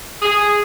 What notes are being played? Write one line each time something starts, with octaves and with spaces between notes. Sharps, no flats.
G#4